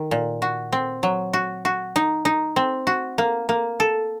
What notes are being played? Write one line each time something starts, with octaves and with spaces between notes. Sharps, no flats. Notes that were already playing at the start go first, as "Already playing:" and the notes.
Already playing: D#3
A#2
F#4
C4
F#3
F#4
F#4
D#4
D#4
C4
F#4
A#3
A#3
A4